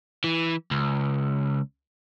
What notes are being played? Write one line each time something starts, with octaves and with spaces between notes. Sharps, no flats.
E3
C#2